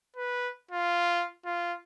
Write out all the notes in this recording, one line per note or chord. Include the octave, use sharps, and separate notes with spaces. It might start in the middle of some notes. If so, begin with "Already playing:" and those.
B4
F4
F4